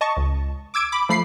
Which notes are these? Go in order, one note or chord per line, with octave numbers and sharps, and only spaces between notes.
D#5 A5 C#6
C#2
D6 E6 G#6 D7
B5 D6
F3 A3 B5 C7